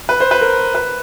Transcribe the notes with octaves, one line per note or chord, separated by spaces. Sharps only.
B4
C5
B4
A#4
B4